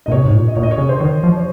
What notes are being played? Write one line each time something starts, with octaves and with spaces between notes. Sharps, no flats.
A#2 D#5
C3 C#5
G#2
A#2
D#5
A#2 C#5
D#5
C#5
C#3
C5
D#3 C#5
F3
C#5